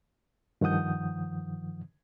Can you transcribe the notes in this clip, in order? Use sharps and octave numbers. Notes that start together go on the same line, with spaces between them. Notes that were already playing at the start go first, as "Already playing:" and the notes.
G2 D#3 F3 F#5 D#6 G6